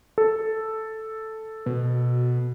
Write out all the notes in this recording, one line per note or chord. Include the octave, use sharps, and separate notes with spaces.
A4
B2